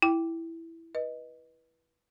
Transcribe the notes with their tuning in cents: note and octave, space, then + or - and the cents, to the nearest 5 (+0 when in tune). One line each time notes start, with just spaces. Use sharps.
E4 +0 G5 +0
B4 -20 D#5 +0